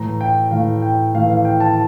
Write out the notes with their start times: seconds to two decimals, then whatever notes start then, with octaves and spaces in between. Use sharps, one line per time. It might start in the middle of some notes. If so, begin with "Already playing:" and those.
Already playing: A2 E3 A3 A#5
0.21 G5
0.51 A2 E3 A3 F5
0.82 G5
1.14 A2 E3 A3 F5
1.30 F5
1.45 G5
1.60 A5